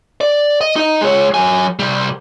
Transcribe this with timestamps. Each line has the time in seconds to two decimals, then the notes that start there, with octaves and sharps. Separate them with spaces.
0.21 D5
0.61 D#5
0.76 D#4 D#5
1.01 G#3 C#5
1.34 F#3 G#5
1.79 C3 G3